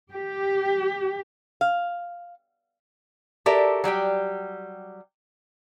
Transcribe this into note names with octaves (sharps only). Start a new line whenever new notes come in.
G4
F5
F#4 G4 A4 A#4 D5 E5
F#3 G3 G4 G5